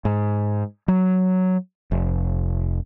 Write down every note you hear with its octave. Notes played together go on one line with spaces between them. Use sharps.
G#2
F#3
F1